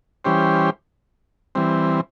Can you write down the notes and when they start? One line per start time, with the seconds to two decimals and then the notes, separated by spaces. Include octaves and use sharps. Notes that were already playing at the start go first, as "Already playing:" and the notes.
0.24 E3 G3 C#4 G4 C5
1.55 E3 G3 C4